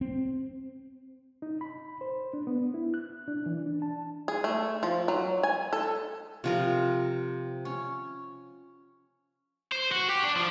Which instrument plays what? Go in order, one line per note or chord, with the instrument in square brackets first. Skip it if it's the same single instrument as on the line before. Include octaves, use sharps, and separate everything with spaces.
[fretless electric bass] C4
[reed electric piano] D#4
B5
C5
D4
B3
E4
F#6
D4
E3
D4
A5
[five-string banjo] G#4
A3
F3
F#3
G#5
A4
[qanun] C3 F3 A#4
C#4
[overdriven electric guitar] C5
F#4
G4
D4
F3